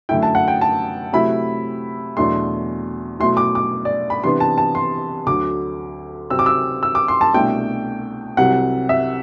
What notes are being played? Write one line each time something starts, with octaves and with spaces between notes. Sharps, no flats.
F#2 D3 A3 E4 G5
A5
F#5
G5
A5
C3 F#3 A3 E4 B5
E2 B2 F#3 A3 D4 C6
B2 F#3 A3 E4 C6
D6
D6
D5
B5
C3 E3 B3 D4 C6
A5
A5
C6
D2 D3 F#3 D6
C3 F#3 C4 E6
D6
E6
E6
D6
C6
A5
C2 B2 A3 D4 G5
C2 C3 F#3 F#5
E5